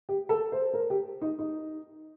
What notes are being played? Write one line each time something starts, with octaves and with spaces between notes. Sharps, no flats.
G4
A4
C5
A#4
G4
D#4
D#4